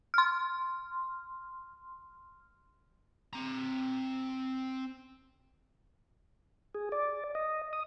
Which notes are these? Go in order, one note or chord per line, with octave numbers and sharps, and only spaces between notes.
C6 F6
C4 A#5
G#4
D5
D#5
D#6